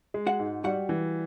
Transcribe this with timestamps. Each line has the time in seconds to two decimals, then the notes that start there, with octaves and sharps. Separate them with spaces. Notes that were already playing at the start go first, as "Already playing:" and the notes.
0.14 G#3
0.27 F#4 F#5
0.39 G#2
0.64 G3 F#4 F#5
0.89 E3